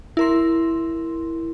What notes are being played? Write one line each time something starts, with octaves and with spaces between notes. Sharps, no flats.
E4 A#4 C6